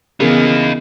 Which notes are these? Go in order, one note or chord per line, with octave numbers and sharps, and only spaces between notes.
C#3 E3 B3 D#4 A#4 F5